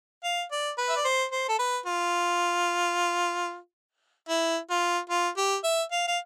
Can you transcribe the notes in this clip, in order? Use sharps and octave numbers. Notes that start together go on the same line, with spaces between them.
F5
D5
B4
E5
D5
C5
C5
A4
B4
F4
E4
F4
F4
G4
E5
F5
F5